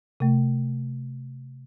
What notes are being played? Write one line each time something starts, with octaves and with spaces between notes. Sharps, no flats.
C3 A3